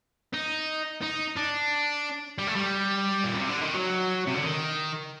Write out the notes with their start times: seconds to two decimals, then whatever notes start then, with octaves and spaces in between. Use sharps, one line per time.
0.33 D#4
1.02 D#4
1.36 D4
2.38 G3
2.47 A3
2.55 G3
3.24 A#2
3.36 C3
3.49 D3
3.62 D#3
3.74 F#3
4.27 C3
4.34 D3
4.43 D#3